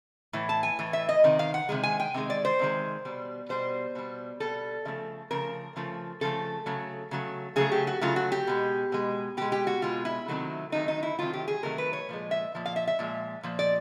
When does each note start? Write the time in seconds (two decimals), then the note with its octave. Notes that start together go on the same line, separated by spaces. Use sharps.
0.33 A2 E3
0.49 A5
0.63 G#5
0.79 A2 E3
0.93 E5
1.09 D#5
1.24 C3 D#3
1.39 F5
1.54 F#5
1.69 C3 D#3 G#3
1.83 G#5
2.00 G5
2.14 C3 D#3 G#3
2.30 D5
2.45 C5
2.59 C3 D#3 G#3
3.05 B2 G3
3.49 B2 G3 C5
3.95 B2 G3
4.40 B2 G3 A4
4.85 C#3 F3 A3
5.31 C#3 F3 A3 A#4
5.76 C#3 F3 A3
6.21 C#3 F3 A3 A4
6.66 C#3 F#3 A3
7.11 C#3 F#3 A3
7.56 C#3 F#3 A3 G#4
7.72 G4
7.87 F#4
8.01 C#3 F#3 A3 F4
8.16 F#4
8.32 G4
8.47 B2 G#3
8.92 B2 G#3
9.37 B2 G#3 G4
9.52 G4
9.67 F#4
9.82 B2 G#3 F4
10.05 E4
10.28 C3 D#3 F#3 A3
10.72 C3 D#3 F#3 A3 D#4
10.88 D#4
11.03 E4
11.19 C3 D#3 F#3 A3 F4
11.33 G4
11.48 G#4
11.63 C3 D#3 F#3 A3 A#4
11.78 B4
11.93 C#5
12.09 A#2 F3 G#3
12.31 E5
12.55 A#2 F3
12.66 F5
12.76 E5
12.87 E5
12.99 A#2 F3 G#3
13.43 A#2 F3
13.59 D5